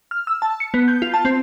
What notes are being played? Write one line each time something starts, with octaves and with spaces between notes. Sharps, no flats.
F6
E6
A5
C#7
B3
G6
F4
A5
C4